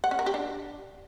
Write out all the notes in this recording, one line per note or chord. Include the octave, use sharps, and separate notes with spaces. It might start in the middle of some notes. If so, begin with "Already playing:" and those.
F#5
C#4
A#4
G4
D4